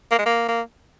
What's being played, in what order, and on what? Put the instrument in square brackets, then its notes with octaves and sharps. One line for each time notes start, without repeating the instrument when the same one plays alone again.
[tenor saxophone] A#3
G#3
A#3
A#3